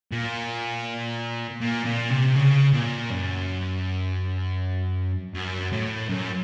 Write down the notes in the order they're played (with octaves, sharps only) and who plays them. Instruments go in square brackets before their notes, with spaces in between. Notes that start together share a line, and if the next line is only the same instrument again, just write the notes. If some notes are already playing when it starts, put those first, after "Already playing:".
[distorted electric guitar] A#2
A#2
A#2
C3
C#3
A#2
F#2
F#2
A2
F#2